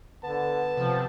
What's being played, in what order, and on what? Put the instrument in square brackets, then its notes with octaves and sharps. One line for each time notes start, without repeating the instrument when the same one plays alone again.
[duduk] D3 [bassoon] B3 [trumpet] A5
[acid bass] C3 [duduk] F3